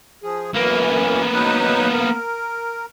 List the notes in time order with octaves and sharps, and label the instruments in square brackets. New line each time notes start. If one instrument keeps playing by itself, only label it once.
[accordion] F3 G#4
[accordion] F#2 E3 [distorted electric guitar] A#3 B3
[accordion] F#3 D#4 B4
A#4